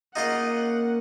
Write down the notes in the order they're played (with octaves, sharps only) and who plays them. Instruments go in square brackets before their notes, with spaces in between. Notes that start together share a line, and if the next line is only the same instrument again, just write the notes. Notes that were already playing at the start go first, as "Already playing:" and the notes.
[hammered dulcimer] C#3 A#3 [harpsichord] D#4 F4 D#5 [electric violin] F#5